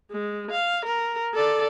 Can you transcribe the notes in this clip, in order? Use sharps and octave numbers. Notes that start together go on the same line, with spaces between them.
G#3
F5
A#4
A4 D5